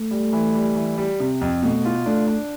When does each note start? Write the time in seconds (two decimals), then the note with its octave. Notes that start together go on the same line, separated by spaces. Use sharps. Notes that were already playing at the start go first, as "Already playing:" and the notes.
Already playing: A3
0.11 G3
0.33 E3
0.55 G3
0.76 E3
0.98 G3
1.20 C3
1.41 F2
1.63 B2 A3
1.85 F4
2.06 A3 D4
2.28 D4